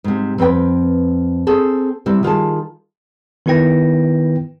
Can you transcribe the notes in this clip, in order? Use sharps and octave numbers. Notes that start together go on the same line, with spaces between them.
G#2 C3
F2 C4 B4 G5
C4 G#4 A4
C3 G3 E4
D#3 F4 G#4 A5
D#3 B3 E4 B4 G5 A#6